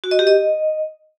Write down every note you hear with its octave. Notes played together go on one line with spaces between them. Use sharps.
F#4
D#5
G4
D#5